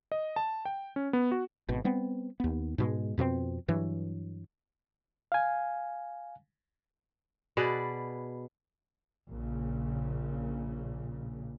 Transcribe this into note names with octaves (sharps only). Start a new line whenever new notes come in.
D#5
A5
G5
C#4
B3
F#4
G#1 B2
G3 B3 C4
D#2 B3
G#2 B2 G#3
F2 B2 A#3 C4
G2 E3 F#3
F5 G#5
B2 G#4 B4 D5
A#1 A#2 C#3